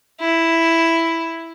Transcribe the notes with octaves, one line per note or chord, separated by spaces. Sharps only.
E4